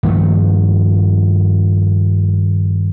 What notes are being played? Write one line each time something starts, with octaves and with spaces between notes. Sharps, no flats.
G2 D#3 F3 A3